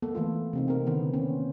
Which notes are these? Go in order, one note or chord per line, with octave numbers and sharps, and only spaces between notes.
A#3 B3 A4
E3 A3 F4
C3 C4 D#4
C4 A#4
D3 D#3 B3
A#3 C4 C#4